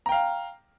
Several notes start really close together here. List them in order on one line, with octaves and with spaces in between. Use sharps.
A#5 G5 F5